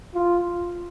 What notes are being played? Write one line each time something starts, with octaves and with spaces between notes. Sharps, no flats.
F4